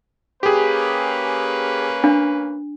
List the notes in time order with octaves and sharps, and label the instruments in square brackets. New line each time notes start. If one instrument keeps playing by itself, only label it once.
[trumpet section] A#3 C#4 B4 [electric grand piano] G4 G#4
[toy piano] D4